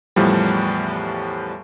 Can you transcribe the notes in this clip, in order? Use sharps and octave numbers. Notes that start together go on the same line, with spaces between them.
E2 A2 F3 G3